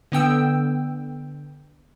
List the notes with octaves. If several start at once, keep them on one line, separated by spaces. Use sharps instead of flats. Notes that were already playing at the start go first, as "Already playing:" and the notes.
D3 B3 G5 E6